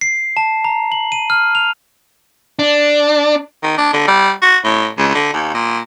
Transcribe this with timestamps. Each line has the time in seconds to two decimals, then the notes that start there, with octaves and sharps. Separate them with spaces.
0.01 C7
0.37 A5
0.65 A#5
0.92 F#7
1.12 D#7
1.30 F6
1.55 F7
2.59 D4
3.63 D#3
3.78 D4
3.93 D3
4.07 G3
4.42 F#4
4.64 A2
4.98 C#2
5.14 D3
5.33 D#2
5.54 A#2